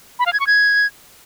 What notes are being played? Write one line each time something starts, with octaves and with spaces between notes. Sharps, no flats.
B5
F5
G#6
C#6
G#6